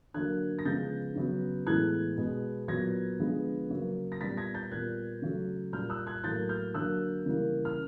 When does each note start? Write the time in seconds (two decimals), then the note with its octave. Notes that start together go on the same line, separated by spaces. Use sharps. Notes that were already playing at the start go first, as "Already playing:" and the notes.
0.14 D3 F#3 A#3 F#6 G#6
0.59 A#6
0.65 C#3 F3 G#3 B3 G6 A6
1.16 C#3 F#3 B3
1.67 A2 E3 G#3 B3 F#6 G#6
2.18 B2 G#3 B3
2.68 A#2 F#3 B3 G#6 A#6
3.19 D3 F3 G#3 B3
3.70 C#3 F#3 A#3
4.12 A#6
4.21 A#2 G3 B3 A6 B6
4.37 G#6 A#6
4.54 G6 A6
4.71 A#2 G3 B3 F#6 G#6
5.22 C#3 F#3 A3
5.73 A#2 G3 A#3 F6 G6
5.90 E6 F#6
6.07 F#6 G#6
6.24 A2 F#3 A#3 G6 A6
6.49 F6 G6
6.74 D3 F#3 A#3 E6 F#6
7.25 C#3 E3 G3 A#3
7.65 F6